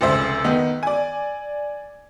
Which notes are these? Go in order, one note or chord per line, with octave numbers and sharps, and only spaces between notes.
F1 C#2 C5 E5
D#3 B3 D#4
D5 G#5